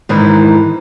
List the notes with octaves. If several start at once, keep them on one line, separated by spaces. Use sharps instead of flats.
G#2 D#3 E3